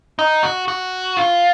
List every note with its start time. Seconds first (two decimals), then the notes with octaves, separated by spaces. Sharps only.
0.19 D#4
0.43 F#4
0.68 F#4
1.17 F4